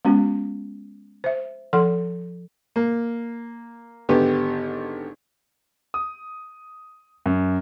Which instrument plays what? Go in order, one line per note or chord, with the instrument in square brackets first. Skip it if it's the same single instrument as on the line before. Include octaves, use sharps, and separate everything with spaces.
[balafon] G#3 B3 C#4 F#4
C5 E5
F3 A4 F#5 C6
[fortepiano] A#3
G#1 D3 B3 G4
[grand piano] D#6
F#2